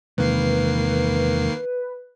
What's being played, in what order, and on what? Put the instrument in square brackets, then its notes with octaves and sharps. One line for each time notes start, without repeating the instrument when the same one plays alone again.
[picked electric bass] E2 C3 G#3 [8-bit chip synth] D#3 A#3 C7 [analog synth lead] B4